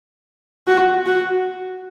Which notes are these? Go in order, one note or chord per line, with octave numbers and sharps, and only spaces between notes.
F#4
F#4